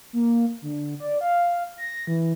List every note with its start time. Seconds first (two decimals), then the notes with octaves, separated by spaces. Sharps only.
0.13 A#3
0.62 D3
1.00 D5
1.21 F5
1.78 A#6
2.07 E3